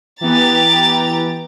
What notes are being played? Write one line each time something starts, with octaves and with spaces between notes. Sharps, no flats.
E3 B3 G4 A#5 A6